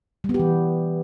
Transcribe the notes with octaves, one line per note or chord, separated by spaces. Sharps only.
G3
B3
G4
E3